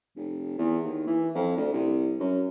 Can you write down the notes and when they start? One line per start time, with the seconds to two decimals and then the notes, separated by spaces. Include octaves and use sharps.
0.16 F1
0.58 E2
0.84 D#2
1.07 E3
1.35 F2
1.57 D2
1.73 C2
2.20 F#2